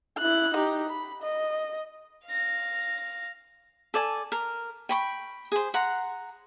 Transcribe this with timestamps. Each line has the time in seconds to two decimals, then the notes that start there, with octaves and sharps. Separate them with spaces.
0.18 E4 F#6
0.55 D#4 G4
0.89 B5
1.22 D#5
2.26 F5 A#6
3.94 A4 D5 G#5
4.32 A#4
4.89 G5 B5 C#6
5.52 G#4 C5
5.74 F#5 A#5 C6